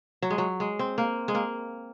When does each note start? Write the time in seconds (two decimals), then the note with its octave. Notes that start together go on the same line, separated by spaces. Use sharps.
0.22 F#3
0.30 G#3
0.38 F#3
0.60 G#3
0.79 C4
0.98 A#3
1.28 G#3
1.35 A#3